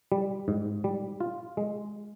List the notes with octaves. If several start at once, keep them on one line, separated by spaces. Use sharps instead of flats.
G3
G#2
G3
F4
G#3